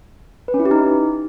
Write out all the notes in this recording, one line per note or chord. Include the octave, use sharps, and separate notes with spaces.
B4
C#4
E4
G4
D#4